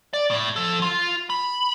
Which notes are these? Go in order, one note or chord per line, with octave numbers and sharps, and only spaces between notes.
D5
A2
F3 A4
F4
B5